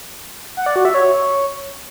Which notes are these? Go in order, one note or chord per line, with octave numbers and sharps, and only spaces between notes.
F#5
D5
F#4
E5
C#5